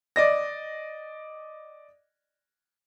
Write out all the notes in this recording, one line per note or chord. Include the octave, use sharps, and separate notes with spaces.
D5 D#5 A#6